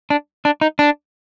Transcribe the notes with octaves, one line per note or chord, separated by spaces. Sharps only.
D4
D4
D#4
D4